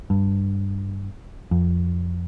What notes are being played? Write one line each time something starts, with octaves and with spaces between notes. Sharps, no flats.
G2
F2